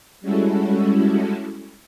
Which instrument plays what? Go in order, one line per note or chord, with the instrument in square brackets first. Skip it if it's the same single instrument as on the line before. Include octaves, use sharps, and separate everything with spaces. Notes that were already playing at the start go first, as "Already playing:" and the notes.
[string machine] G3 G#3 C#4 E4 F#4 A4